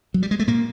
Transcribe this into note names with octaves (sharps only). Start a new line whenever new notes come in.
F#3
G3
G#3
A3
A#2 A#3